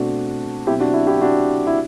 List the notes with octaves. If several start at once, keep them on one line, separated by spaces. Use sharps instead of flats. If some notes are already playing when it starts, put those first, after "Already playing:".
Already playing: B2 A3 C4 D4 F#4
B2 F#3 C4 E4 G4
D4 F#4
E4
E4 G4
D4 F#4
E4